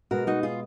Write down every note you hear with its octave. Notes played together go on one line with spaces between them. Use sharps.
B2 G#3 F#4 A#4
D#4 F#4
F4 G#4